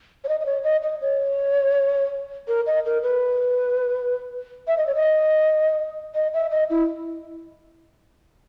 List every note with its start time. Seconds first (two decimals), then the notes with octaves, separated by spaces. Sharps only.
0.24 C#5
0.29 D#5
0.40 D#5
0.46 C#5
0.64 D#5
0.82 D#5
1.01 C#5
2.48 A#4
2.67 D#5
2.85 A#4
3.03 B4
4.68 E5
4.78 D#5
4.87 C#5
4.95 D#5
6.15 D#5
6.34 E5
6.51 D#5
6.70 E4